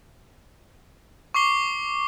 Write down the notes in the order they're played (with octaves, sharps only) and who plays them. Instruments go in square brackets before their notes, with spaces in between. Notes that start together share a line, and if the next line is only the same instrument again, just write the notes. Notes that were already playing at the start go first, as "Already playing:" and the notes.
[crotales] C#6 D6 C7 G7